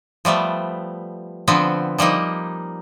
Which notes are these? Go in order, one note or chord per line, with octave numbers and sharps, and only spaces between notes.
F3 G3 A3 B3
D3 F3 B3 C4
F3 G3 A#3 D#4